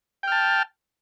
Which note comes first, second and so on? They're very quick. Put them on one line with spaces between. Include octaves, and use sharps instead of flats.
G5 F6 A5